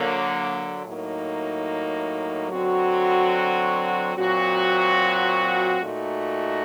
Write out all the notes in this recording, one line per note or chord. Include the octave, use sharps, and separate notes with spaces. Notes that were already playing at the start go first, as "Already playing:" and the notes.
Already playing: D3 F#3 A#3
A2 F#3 A#3 D#4
D3 F#3 C4 F#4
A#2 F#3 C4 F#4
A#2 A3 D#4 F#4